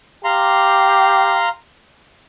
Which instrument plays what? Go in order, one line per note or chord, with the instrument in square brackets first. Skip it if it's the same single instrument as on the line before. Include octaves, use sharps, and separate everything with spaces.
[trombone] G4 [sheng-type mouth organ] F5 A#5 C6